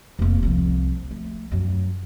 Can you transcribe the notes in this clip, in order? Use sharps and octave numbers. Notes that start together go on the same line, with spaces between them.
F1 A#3
C2 F3
A3
F#2 F#3